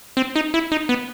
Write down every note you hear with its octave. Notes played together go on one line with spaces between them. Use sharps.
C4
D#4
E4
D#4
B3